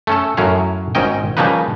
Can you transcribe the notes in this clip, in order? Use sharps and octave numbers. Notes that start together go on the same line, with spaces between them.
A3 C#4 A4
F#2 A2 F#3 C#4 F5
G#1 G#2 C#4 D#5 G5
C#3 F3 G3 A#3 D#4 B4